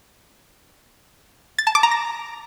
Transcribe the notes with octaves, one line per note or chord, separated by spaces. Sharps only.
A6
A5
D6
A#5
A#6